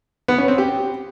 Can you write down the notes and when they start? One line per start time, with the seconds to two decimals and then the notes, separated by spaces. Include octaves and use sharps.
0.28 B3
0.38 C#4
0.48 C4
0.58 G4